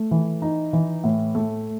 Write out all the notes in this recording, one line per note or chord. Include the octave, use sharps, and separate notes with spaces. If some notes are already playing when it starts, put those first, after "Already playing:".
Already playing: A3
E3
D#4
E3
A2
A3